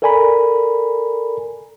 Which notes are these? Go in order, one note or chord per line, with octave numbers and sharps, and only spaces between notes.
A4 A#4 D5 G#5 A#5 B5